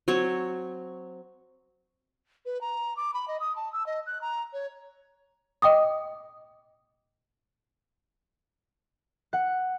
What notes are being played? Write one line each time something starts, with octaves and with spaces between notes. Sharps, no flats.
F#3 C4 C#5 C#6
B4
A#5
D6
B5
D#5
D#6
A5
E6
D#5
F#6
A#5
C#5
D#5 G5 D6 D#6
F#5